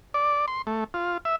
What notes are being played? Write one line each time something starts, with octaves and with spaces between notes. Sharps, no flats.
D5
C6
A3
F4
E5